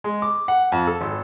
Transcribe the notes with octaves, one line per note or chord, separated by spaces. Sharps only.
G#3
D6
F#5
F2
A4
G#1